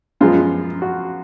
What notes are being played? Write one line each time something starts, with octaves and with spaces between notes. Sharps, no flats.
F#2 F3 G#3 B3 F4
F#4